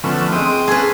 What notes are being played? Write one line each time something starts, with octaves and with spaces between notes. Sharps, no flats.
D3 F3 A3 B3 C#4
G#3 C4 G5 C6 D#6
C#4 G#4 A4 B4